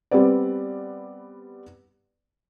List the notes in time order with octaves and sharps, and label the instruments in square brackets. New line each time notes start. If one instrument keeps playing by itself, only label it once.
[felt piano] G3 B3 C4 B4 D5